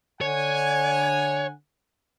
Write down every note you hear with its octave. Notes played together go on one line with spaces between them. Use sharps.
D3 C#5 F#5 G#5